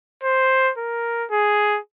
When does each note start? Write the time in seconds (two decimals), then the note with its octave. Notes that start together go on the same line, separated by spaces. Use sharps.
0.23 C5
0.78 A#4
1.31 G#4